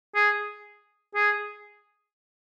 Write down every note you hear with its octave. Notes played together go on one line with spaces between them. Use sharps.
G#4
G#4